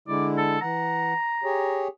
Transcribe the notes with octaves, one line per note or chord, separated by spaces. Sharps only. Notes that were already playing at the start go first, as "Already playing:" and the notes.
D3 G#3 E4 D5
A4
E3 F#5 A#5
G4 G#4 C#5